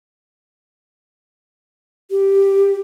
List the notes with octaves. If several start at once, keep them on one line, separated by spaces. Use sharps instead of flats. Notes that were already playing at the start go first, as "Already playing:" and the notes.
G4